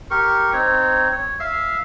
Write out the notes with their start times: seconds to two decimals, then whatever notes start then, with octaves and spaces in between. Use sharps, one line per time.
0.11 G4 A#4 C#6
0.53 C4 D#4 C#5
1.12 C#5
1.40 E5 F5